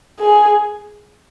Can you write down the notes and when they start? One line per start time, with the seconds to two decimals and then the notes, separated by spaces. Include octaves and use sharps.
0.20 G#4